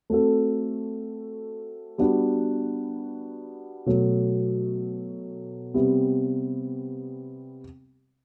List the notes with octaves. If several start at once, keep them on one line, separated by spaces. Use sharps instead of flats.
A3 C4 F#4 A4
G3 B3 D4 F#4
B2 F#3 A3
C3 G3 B3